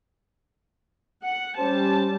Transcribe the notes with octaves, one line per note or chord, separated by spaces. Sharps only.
F#5
G3 C#4 C5 A5